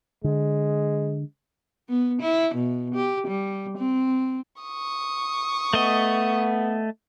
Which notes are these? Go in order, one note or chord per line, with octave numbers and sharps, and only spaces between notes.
D3 G#3
B3
E4
B2
G4
G3
C4
C#6 D#6
A3 B3 D#5